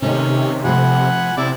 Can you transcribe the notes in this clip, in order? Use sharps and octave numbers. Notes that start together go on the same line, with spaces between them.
C3 D#3 A3 C#4 D#4
F3 A3 F#5 G#5 B5
C3 E4 D5